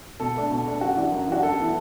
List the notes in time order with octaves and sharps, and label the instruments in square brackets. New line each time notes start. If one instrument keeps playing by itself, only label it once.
[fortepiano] B2 [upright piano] A4
[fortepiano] A3 D4
B2
A3 D4
[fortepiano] F#2 [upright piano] F#4
[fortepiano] E3 D4
F#2
[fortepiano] E3 D4 [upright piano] F#4
[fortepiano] F#2 [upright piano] A4
[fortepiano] E3 B3